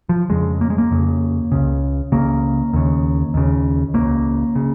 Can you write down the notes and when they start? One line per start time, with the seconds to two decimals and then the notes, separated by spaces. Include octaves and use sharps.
0.09 F3
0.30 F2 C#3 G#3
0.61 A#3
0.70 G#3
0.78 A#3
0.91 F2 C#3
1.52 C#2 C#3
2.12 C#2 C#3 A#3
2.73 D#2 C#3
3.34 D#2 C#3
3.94 C#2 C#3 A#3
4.56 C#3